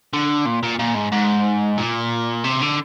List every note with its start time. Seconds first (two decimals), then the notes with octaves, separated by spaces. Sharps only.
0.14 D3
0.46 A#2
0.63 A#2
0.79 A#2
0.95 G#2
1.12 G#2
1.78 A#2
2.44 C3
2.61 D3